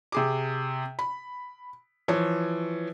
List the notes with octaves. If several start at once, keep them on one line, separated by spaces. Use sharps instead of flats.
C3 G#4 D6
B5
E3 F3 C#5